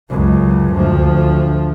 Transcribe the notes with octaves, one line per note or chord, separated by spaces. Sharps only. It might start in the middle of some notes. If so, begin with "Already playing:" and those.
C#2 F#2
D2 F3